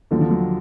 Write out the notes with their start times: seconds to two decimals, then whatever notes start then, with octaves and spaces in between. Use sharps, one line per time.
0.11 D#2 D3 F3 F#3
0.21 F3
0.31 F#3